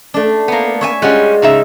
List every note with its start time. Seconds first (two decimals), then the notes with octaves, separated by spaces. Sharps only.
0.14 A3 D4
0.48 A#3 B3
0.81 C#5 E5 G#5
1.02 G3 G#3 C#4 F4 F#5
1.42 C#3 D#4 E5